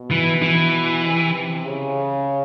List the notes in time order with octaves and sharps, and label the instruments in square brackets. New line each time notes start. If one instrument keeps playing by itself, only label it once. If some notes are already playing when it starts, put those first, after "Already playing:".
Already playing: [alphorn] B2
[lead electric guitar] E3
E3
[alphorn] C3
C#3